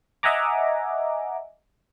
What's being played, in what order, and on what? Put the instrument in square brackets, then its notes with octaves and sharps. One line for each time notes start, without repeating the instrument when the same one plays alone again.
[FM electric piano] D#5 E5 F#5 G#5 A#5 D6